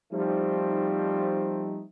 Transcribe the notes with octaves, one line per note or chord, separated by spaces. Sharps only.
F3 G3 A3 C4 D#4